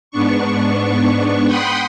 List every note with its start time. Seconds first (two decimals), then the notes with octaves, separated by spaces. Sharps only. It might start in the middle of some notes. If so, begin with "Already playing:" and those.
0.11 G#2 B3 D4 C#6
1.46 F#5 G5 B5 C6 D#6